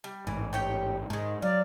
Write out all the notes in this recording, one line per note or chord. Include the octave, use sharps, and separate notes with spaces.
G3
A1 G#2 E3
G4 C#5 G5
G#2 D#3 G#3
F#3 D5 F5